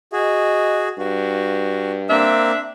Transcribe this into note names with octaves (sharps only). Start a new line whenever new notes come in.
F#4 G#4 D#5
G2 F#4
A#3 C4 D4 E5